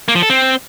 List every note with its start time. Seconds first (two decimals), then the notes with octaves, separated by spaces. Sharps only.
0.08 A#3
0.15 F3
0.22 A4
0.29 C4